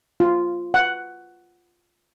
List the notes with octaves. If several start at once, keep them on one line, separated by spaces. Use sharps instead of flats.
F4
F#5